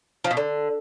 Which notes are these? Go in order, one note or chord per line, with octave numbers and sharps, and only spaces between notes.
F3
B2
D3